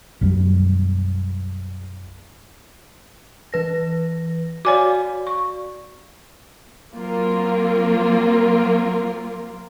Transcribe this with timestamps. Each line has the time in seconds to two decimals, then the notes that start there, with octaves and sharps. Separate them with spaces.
0.21 B1 F#2 F#3 G3
3.53 E3 B4 A#6
4.65 F#4 C#5 D5 F5 G#5 D6
5.27 C#6
6.94 F#3 A#3 C4 F4 A#4